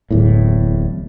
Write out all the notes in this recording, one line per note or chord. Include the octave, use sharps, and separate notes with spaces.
D1 E2 A2